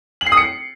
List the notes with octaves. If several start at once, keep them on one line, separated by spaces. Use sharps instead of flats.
F#7
C7
D#6
C#7